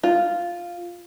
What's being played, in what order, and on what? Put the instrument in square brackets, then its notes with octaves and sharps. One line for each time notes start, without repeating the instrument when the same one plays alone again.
[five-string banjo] F4